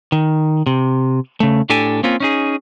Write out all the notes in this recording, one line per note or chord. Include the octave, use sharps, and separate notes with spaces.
D#3
C3
C#3 A3
A2 D4 G4 A4 G#5
A#3 C4 C#4 F4
C#4 D#4 G#4